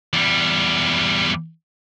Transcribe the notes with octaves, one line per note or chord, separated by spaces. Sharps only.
E2 G3